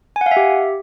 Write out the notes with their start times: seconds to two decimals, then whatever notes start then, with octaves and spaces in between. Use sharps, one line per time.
0.16 G#5
0.21 F#5
0.26 F5
0.31 E5
0.37 G4